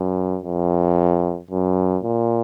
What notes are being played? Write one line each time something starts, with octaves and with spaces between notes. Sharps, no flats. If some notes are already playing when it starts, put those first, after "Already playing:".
Already playing: F#2
F2
F#2
A#2